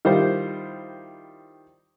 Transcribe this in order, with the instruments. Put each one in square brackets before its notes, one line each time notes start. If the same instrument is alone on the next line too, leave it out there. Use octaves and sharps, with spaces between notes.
[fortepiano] D#3 G3 E4 F4 C5